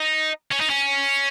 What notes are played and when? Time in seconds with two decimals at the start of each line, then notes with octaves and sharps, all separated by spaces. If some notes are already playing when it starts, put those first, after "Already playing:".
Already playing: D#4
0.51 C#4
0.60 D#4
0.70 C#4